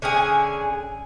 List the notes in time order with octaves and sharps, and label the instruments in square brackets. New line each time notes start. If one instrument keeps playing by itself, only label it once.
[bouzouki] D3 C#4 G#4 G#5